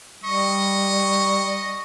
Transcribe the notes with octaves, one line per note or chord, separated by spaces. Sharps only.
G3 D#5 C#6